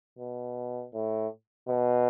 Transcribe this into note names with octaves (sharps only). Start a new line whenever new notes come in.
B2
A2
B2